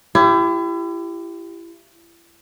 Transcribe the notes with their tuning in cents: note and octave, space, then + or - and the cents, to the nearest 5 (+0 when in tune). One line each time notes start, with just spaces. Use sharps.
E4 +35 G4 +0